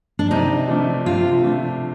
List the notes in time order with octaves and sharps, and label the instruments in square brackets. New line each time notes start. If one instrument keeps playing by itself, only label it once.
[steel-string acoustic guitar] D4
[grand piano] C3 [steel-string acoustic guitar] D#4
[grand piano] F3 A3 D4
[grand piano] C3 [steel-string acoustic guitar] F4
[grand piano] F3 A3 D4